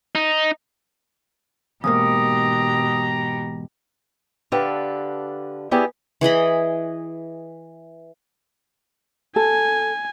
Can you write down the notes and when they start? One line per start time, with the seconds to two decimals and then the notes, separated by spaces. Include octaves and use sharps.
0.15 D#4
1.84 E2 G#2 B2 A#3 G4 A#5 D#6
4.52 D3 D4 G4 A4 B4 F5
5.71 B3 E4 G4 G#4 D5
6.21 E3 G#4 D#5 B5
9.36 A4 G#5